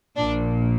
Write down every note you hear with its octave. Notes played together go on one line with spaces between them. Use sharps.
A#1 A#2 D4